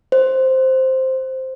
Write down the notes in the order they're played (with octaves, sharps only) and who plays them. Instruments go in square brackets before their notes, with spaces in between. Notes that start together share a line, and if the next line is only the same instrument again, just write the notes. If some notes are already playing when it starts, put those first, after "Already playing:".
[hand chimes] C5